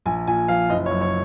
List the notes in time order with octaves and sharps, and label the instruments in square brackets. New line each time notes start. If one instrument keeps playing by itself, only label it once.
[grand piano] A#1 G#5
A#2 G#5
F3 F5
F#1 D#5
C#5
F#2
C#5